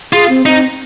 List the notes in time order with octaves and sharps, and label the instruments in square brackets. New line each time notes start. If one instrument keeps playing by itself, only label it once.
[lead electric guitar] F4 [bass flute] G#4
[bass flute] C4
[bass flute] C4 [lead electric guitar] D#4